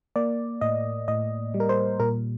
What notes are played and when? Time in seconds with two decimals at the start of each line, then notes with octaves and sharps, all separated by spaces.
0.16 A#3 D5
0.61 A2 D#5
1.08 A2 D#5
1.54 G3
1.60 A#4
1.69 C5
2.00 A#2 A#4